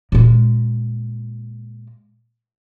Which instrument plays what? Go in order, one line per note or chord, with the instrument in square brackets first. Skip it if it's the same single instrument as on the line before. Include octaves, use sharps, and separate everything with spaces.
[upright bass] A#2 G#3